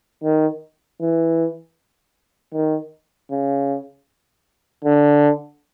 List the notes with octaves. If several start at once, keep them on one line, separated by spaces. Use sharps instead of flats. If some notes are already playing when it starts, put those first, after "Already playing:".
D#3
E3
D#3
C#3
D3